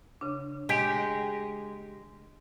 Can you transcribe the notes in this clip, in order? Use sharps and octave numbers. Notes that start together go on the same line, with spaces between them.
C#3 D4
G#3 G4